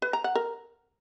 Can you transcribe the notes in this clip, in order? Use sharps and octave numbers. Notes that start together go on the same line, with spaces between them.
B4
A#5
F#5
A#4